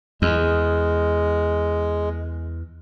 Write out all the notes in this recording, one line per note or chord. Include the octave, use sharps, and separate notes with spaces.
E2 G#3